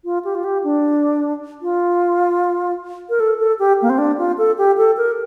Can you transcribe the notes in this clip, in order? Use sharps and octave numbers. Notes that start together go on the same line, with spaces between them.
F4
G4
F4
G4
D4
F4
A#4
A4
A4
G4
A#3
C4
D4
F4
A4
G4
A4
A#4